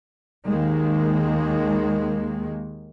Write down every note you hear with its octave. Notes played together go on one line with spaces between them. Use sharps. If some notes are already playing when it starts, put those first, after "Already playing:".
D#2 D#3 G#3 A#3